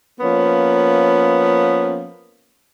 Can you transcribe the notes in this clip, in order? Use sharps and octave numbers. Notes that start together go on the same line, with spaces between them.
F3 A#3 B3 C#4